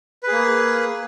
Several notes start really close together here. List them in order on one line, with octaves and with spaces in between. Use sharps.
B4 G#4 A#3